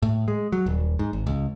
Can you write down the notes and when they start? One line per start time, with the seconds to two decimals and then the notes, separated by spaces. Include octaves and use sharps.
0.02 A2
0.28 G#3
0.52 F#3
0.66 D#1
0.99 G#2
1.13 G#1
1.27 C#2